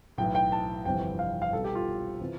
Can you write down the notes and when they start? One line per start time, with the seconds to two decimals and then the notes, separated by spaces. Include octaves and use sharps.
0.18 B1 A2 E3 G5
0.35 G5
0.52 A5
0.85 G1 F2 C3 E3 G5
1.19 F5
1.42 F5
1.53 C2 B2 A4
1.64 G4
1.75 F4
2.21 C3 E3